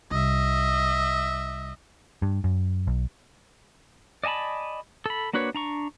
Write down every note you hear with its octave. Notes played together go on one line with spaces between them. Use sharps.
C2 D#5 E5
G2
F#2
B1
D5 D#5 G#5 A5 B5
A4 B5
A#3 D4 F#4 B4 C#5
D4 A#5 C#6